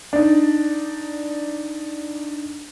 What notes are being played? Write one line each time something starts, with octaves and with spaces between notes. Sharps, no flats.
D4 D#4